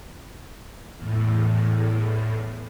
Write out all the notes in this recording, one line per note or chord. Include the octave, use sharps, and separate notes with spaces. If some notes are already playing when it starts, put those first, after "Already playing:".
E2 A2